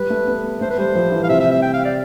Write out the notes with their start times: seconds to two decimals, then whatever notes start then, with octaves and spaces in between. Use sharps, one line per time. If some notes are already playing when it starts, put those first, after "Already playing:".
Already playing: G3 B4
0.10 A3
0.27 B3
0.61 A3 C5
0.70 B4
0.78 G3 C5
0.95 F3
1.12 E3
1.23 F5
1.29 C3 E5
1.40 E5
1.51 E5
1.62 G5
1.74 F5
1.85 D5